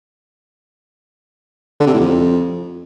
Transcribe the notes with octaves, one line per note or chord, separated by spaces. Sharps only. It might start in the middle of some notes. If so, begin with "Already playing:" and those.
D3
C3
A2
F2